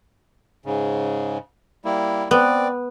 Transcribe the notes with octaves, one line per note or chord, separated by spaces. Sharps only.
G#2 C#3
G3 A#3 E4
B3 C4 D5